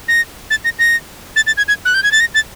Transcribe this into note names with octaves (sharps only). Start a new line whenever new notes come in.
A#6
A6
A#6
A#6
A6
A6
G#6
G#6
F#6
G6
G#6
A6
A#6
A6